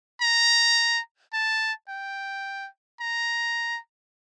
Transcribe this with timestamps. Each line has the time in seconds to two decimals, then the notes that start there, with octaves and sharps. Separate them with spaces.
0.22 A#5
1.34 A5
1.89 G5
3.01 A#5